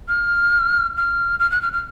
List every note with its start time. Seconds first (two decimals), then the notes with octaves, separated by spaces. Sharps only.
0.08 F6
0.97 F6
1.40 F6
1.51 F#6
1.62 F6
1.73 F6